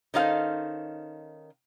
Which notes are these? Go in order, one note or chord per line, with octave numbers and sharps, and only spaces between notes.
D#3 C#4 D#4 A4 C5 F5